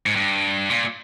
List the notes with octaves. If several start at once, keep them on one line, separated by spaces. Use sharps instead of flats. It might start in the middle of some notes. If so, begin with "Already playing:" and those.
G#2
G2
A#2